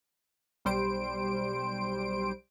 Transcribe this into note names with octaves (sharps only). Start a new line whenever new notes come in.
B1 G3 C5 D7